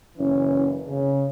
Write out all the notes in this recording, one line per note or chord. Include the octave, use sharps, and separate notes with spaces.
F#1 E3 C#4
C#3